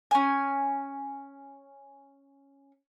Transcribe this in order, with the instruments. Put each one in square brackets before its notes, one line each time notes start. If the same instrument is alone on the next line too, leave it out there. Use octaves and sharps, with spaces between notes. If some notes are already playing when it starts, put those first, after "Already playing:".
[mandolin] C#4 G#5